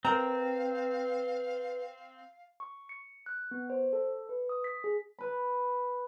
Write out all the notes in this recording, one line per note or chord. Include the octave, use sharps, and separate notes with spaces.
C4 A#4 B4 F5 A#5
C#6
C#7
F#6
B3
C5
A4
B4
D#6
B6
G#4
B4 B5